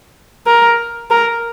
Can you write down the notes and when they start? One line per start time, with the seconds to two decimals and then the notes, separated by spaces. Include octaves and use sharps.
0.47 A#4
1.10 A#4